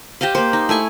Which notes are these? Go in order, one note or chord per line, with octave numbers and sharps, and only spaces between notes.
G4 C5 D#5 F5
A#3 C5
D#4
A3 E4 G#5 C#6